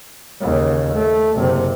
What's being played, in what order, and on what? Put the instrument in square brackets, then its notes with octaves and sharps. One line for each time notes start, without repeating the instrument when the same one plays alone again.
[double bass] D#2 C#3
A3
F#1 C3